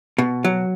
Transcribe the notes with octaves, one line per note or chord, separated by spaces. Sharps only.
B2
F#3